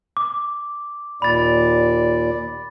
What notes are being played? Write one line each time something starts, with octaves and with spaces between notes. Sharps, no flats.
D6
D#2 A#2 D5 B5 A6